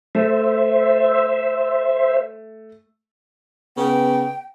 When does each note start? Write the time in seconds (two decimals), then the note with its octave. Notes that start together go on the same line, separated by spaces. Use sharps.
0.15 A3 C5 E5
3.77 C#3 B3 G5